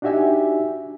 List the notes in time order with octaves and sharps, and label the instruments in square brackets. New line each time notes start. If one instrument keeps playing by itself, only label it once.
[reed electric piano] D4 D#4 F#4 G4 E5 G#5